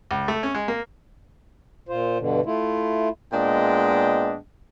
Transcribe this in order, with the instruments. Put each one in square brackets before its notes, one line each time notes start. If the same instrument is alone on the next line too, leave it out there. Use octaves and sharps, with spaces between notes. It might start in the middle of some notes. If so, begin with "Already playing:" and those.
[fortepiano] C#2
A3
C#4
G#3
A#3
[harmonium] A#2 F4 C5
G2 B2 D3
A3 E4 F4
[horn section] A#2 G#3 B3 D4 D#5 G5